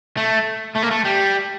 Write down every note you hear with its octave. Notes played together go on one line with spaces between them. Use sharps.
A3
A3
A#3
A3
G3